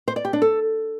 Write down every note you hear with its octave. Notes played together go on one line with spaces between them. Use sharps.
C5
D5
G4
D4
A4